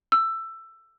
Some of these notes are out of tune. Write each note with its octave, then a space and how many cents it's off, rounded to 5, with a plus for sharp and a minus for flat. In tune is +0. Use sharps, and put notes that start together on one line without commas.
E6 +15